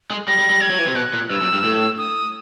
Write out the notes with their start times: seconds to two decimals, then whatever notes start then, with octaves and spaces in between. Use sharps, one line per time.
0.10 G#3
0.28 G3 A#6
0.39 G3
0.50 G3
0.61 G3 G#6
0.70 F#3
0.79 E3
0.87 C3
0.96 B2 F#6
1.13 A#2
1.30 G2 E6
1.41 F#2
1.53 G2
1.64 A2
1.98 D#6